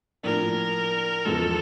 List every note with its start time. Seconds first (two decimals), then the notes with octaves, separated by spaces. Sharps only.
0.23 A2 F3 A#3 D4 A#4
1.25 E2 C#3 F3 G#3 A4